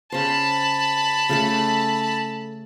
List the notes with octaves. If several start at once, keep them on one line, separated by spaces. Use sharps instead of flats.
C#3 C5 A5 B5
C#3 A3 A4